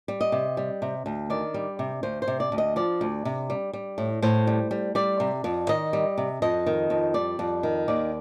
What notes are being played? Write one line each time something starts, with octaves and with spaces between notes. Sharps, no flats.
G3
D#5
C3
G3
C3
D2
D#3 D5
G3
C3
D2 C5
C5
C3
D5
D2
D#5
F3 D5
D2
C3
G3
G3
A2
A2 C5
G3
G3
G3 D5
C3
F2
D#3 D#5
G3
C3
F2 D#5
D#3
F2
G3 D5
F2
D#3
D#2 D5